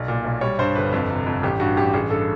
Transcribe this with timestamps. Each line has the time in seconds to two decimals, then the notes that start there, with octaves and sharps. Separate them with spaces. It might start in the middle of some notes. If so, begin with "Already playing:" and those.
Already playing: B1 D5
0.08 A#2
0.24 B1
0.41 G3 C#5
0.59 G2 C5
0.75 G1 B4
0.92 F2
1.09 C3
1.26 F2
1.43 A1 G4
1.60 G2 F#4
1.77 A1 G4
1.94 A1 G#4
2.10 G2 A4